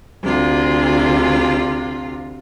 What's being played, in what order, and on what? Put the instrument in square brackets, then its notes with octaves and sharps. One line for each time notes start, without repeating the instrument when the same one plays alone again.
[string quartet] D2 C3 F4